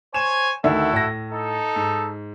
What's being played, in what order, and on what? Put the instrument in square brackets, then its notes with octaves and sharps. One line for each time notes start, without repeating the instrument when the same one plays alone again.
[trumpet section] C5 C#5 G#5 [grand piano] E7
[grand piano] D2 D#3 E5 [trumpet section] E4 F#4 A4
[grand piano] A2 A#6
[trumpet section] D#4 A4
[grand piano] G#2